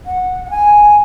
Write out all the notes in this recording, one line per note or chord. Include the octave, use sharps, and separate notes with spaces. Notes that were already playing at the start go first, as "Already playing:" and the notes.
F#5
F#5
G#5